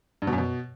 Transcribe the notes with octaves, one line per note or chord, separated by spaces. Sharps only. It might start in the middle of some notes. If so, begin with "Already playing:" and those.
G2
B2
F#2
B2